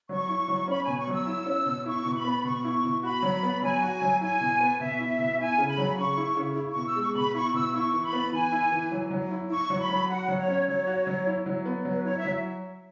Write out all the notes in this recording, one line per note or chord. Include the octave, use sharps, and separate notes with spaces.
F#3 C#6
E4
F#3
C#4 B5
B2 G#5
C#6
F#3 E6
E4
C#4
B2
E4 C#6
B2
B5
B3
B2 C#6
E4
B2
F#4 B5
F#3
B3
F#3 G#5
F#4
F#3
E4 G#5
B2
B3
B2 E5
E4
B2
E4 G#5
C#3
B5
F#3
C#3 C#6
E4
C#3
E4
B2 C#6
E6
G#3
C#6
B2 B5
E4 C#6
B2 E6
E4 C#6
E3
B5
B3
E3 G#5
E4
E3
F#3
F#3
E4
E4 C#6
F#3
B5
F#3
F#4 F#5
F#3
C#5
C#4
F#3 C#5
F#4
F#3
E4
F#3
B3
F#3
B4
E4 C#5
E5
F#3